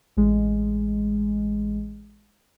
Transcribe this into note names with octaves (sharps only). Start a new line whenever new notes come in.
A1 G#3